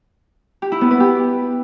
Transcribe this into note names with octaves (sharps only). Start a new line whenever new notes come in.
G4
E4
B3
B4
G4